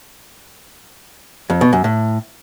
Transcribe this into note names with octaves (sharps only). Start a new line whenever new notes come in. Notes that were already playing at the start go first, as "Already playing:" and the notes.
F2
B2
F#2
A2